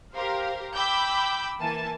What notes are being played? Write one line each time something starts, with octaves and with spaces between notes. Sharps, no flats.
G4 A#4 C5 F5
G5 B5 D6 E6 G6
E3 A#3 G#5 A5